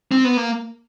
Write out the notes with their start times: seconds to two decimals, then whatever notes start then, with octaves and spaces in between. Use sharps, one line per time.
0.12 C4
0.24 B3
0.37 A#3